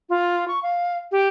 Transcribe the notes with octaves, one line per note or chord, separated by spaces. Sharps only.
F4
C#6
F5
G4